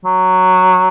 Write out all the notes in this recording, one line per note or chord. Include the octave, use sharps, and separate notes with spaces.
F#3